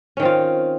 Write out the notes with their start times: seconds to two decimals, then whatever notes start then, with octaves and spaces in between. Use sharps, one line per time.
0.17 C#4
0.20 D#3
0.22 C4
0.25 F4